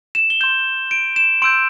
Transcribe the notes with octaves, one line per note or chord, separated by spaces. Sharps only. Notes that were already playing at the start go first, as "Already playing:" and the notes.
E7
G7
C6 G6 E7
D7
E7
C6 E6 G6 D7